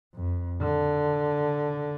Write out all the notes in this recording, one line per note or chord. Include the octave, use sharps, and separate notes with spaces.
F2
D3